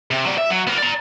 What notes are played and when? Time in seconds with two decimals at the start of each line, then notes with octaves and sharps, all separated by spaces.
0.11 C3
0.25 F#3 D5
0.38 E5
0.50 F#3
0.67 B3 A#4
0.78 D5 A#5